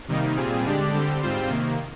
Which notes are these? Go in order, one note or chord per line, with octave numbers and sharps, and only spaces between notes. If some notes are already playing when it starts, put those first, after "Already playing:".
C3 D#3 G3 A#3 D#4
A#2 G3 C4 F4 G#4
D3 G#3 D4 G4 D5
D3 G3 C4 G4
G#2 G3 C4 F4 C5
C3 D#3 A#3